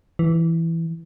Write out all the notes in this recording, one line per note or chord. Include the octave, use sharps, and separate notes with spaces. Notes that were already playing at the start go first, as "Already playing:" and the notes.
E3